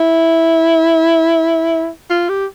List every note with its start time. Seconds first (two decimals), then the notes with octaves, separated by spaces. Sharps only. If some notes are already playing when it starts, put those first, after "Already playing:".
Already playing: E4
2.10 F4
2.29 G4